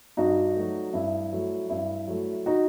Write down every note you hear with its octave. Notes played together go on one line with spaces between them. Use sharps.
G2 D#4 F#4
F#3 A3
G2 E4
F#3 A3
G2 E4
F#3 A3
D#4 F#4